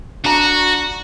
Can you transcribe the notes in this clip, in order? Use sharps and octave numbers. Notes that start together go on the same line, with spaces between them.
D4 F#4 A#5